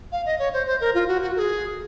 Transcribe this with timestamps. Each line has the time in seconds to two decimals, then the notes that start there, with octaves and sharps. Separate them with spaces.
0.12 F5
0.26 D#5
0.39 C#5
0.53 C5
0.66 C5
0.81 A#4
0.94 F4
1.08 F#4
1.22 F#4
1.35 A#4
1.39 G#4